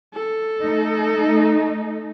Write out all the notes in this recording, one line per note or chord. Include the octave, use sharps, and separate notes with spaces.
A4
A3 D#4